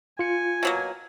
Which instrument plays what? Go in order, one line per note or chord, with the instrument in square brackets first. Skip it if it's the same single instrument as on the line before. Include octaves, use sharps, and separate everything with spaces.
[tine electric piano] F4 C#7 [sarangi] G#5
[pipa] B2 F#3 A#3